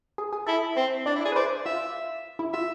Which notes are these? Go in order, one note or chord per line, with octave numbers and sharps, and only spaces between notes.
G#4
G#4
E4 A4
C4 C5
D4 D5
E4
D5
G#4
B4
C5 D5
F4 E5
E4
F4 E5